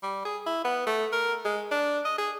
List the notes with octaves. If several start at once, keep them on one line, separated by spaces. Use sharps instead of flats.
G3
G#4
E4
B3
A3
A#4
G#3
D4
D#5
G#4